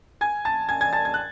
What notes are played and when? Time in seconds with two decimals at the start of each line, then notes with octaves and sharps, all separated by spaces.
0.21 G#5 G#6
0.45 A5 A6
0.69 G#5 G#6
0.81 G#5 G#6
0.93 A5 A6
1.05 G#6
1.14 F#6